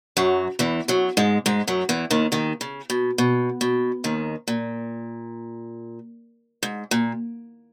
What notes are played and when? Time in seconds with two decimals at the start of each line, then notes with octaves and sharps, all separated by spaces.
0.17 F#2 F#3
0.59 E2 E3
0.88 F#2 F#3
1.17 G#2 G#3
1.46 G#2 G#3
1.68 F#2 F#3
1.89 E2 E3
2.11 D#2 D#3
2.32 D#2 D#3
2.61 C#3
2.90 B2
3.18 B2
3.61 B2
4.04 D#2 D#3
4.48 A#2
6.63 G#2
6.91 A#2